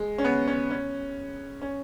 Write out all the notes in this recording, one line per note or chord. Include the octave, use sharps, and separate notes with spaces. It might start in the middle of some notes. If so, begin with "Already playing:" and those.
Already playing: G#3
C#4
B3
C#4
C#4
C#4